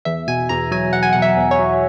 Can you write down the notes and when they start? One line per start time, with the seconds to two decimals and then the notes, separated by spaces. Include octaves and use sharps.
0.05 E2 E5
0.27 B2 G#5
0.49 E2 A#5
0.71 F#3 G#5
0.93 E2 F#5
1.03 G#5
1.13 B2 F#5
1.22 E5
1.37 E2
1.51 C#5
1.59 F#3